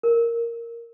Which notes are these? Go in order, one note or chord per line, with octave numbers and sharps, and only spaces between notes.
A#4